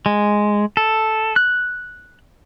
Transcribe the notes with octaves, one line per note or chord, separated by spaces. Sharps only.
G#3
A4
F#6